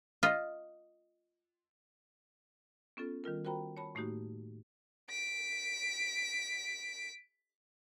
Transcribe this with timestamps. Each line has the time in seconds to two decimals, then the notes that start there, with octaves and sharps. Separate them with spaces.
0.23 F4 D#5
2.97 B3 C#4 F4 A4
3.24 D#3 G3 F4 A#4
3.45 F#4 A#4 C5 G5 A#5 B5
3.77 C#5 A5 B5
3.95 A2 A3 A#3 D#4 F#4 G4
5.10 B6 D7